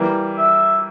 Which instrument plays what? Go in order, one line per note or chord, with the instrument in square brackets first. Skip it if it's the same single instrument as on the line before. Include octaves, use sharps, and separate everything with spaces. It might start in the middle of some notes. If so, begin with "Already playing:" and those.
Already playing: [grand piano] E3 G3 A#3
[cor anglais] E5